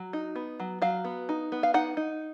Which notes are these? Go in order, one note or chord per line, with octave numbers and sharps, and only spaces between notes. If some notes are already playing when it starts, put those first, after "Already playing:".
Already playing: F#3
D#4
B3
F#3
F#3 F5
B3
D#4
B3
F5
D#4 F#5
D#4